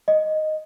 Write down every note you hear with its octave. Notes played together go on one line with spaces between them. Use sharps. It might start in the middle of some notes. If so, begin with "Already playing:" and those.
D#5